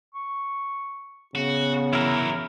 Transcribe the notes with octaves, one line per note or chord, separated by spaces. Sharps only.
C#6
C#3 B3 F#4
E3 F#3 E4 A#4